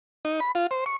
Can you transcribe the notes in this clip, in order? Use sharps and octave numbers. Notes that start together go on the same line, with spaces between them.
D#4
B5
F4
C5
C#6